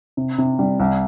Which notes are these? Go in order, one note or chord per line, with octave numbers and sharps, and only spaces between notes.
C3
C3
G3
C2